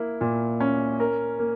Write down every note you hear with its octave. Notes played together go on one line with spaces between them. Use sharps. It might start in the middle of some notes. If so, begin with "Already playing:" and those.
Already playing: A#3 E4
A#2
C#4
A#4
A#3